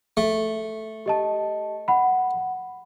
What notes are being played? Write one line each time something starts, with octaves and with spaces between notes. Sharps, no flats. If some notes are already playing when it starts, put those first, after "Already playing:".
A3
G4 D#5 A5
F#5 B5